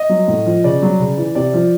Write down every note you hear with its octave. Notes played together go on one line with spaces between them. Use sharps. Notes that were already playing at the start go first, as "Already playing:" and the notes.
Already playing: D#5
F#3
A2
F3
C#3 D5
F#3
C#3
E3
C3 D5
F3